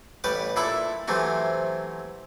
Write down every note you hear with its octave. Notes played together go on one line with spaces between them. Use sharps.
A1 G3 G4 B4 C#6 D6
A#2 D4 E4 A4 E5 B5
C3 E3 F#3 A3 C4 C#4